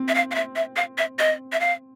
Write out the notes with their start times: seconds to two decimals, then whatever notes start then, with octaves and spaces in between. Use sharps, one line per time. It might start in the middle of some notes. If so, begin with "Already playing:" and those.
Already playing: C4
0.08 E5
0.14 F5
0.31 F5
0.35 E5
0.56 E5
0.76 F5
0.98 E5
1.19 D#5
1.52 E5
1.60 F5